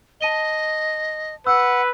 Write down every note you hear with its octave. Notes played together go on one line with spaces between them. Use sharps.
D#5 A5 D#7 G7
B4 F#5 E6